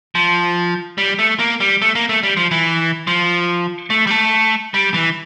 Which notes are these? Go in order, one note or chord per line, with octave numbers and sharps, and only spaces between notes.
F3
G3
A3
A#3
G3
A3
A#3
A3
G3
F3
E3
F3
A3
G3
A3
G3
E3